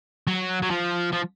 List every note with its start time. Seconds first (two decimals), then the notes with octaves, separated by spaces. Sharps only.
0.27 F#3
0.62 F#3
0.70 F3
1.12 F3